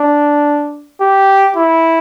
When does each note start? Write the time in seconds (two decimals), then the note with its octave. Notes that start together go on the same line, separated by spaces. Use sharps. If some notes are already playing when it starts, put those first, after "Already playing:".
Already playing: D4
1.01 G4
1.56 E4